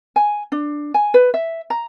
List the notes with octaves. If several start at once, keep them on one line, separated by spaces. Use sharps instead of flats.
G#5
D4
G#5
B4
E5
A#5